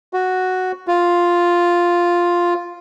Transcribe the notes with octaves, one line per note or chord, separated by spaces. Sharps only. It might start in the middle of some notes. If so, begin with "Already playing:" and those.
F#4
F4